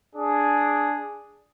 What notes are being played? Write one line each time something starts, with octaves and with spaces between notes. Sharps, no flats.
D4 G#4